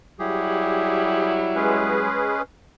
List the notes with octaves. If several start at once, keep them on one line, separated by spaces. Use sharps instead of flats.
F#3 G3 E4 G4 G#4
G#3 C#4 G#4 B4